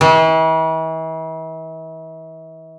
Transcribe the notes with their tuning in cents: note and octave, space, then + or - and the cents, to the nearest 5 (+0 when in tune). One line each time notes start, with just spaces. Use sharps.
E3 -40